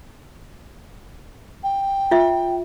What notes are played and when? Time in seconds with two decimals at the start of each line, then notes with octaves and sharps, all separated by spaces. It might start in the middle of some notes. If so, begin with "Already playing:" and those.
1.63 G5
2.11 F4 E5